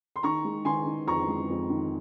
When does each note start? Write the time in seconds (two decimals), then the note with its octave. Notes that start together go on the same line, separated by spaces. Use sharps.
0.16 C6
0.23 D#3 A#5 C#6
0.44 G#3
0.65 D#3 G#5 C6
0.86 D#3
1.07 F2 A#5 C#6
1.28 G#3
1.49 F2
1.70 D#3